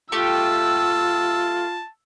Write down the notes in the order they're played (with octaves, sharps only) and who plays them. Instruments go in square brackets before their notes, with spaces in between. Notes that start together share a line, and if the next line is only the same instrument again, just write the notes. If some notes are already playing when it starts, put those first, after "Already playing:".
[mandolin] A3 G4 [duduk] F4 [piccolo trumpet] A5 [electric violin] E6